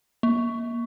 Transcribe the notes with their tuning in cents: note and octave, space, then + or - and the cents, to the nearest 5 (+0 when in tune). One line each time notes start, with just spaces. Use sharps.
A#3 +20